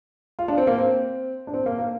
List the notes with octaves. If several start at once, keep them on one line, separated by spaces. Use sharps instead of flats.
F4
D4
C4
A#3
C4
D4
C4
A#3
A#3